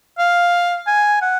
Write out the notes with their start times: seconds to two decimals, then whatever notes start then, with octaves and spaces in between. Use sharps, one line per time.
0.18 F5
0.87 G#5
1.22 F#5